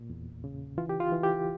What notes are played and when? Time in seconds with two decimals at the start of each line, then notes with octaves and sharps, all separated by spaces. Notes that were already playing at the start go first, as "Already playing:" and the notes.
Already playing: A#2
0.10 E2
0.44 C#3
0.78 E3 F4
0.89 G4
1.00 F4
1.12 E3
1.23 G4